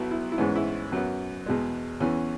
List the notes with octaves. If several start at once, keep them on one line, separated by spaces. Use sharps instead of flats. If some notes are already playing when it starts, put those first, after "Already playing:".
Already playing: B1 B2 F#3 B3 E4
E4
E4
G#2 E3 G#3 B3 C#4
E4
F#2 F#3 B3
E2 B2 G#3
E2 E3 B3 C#4